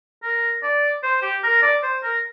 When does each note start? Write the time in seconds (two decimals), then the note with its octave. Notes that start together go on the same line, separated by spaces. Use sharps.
0.23 A#4
0.63 D5
1.03 C5
1.22 G4
1.43 A#4
1.62 D5
1.83 C5
2.03 A#4